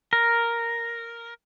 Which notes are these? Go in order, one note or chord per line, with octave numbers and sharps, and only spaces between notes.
A#4